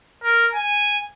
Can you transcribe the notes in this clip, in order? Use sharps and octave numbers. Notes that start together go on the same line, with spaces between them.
A#4
G#5